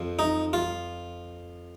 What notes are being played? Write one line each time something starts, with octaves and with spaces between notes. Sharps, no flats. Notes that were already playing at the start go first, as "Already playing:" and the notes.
Already playing: F2 F3
D#4
F4